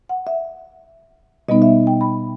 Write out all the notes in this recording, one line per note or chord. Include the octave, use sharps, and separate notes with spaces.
F#5
E5
B2 G3 B3 D#4 D#5
E5
G5
B5